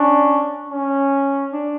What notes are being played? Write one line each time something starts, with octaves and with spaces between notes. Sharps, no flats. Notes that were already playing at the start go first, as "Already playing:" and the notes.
Already playing: C#4 D4
C#4
D4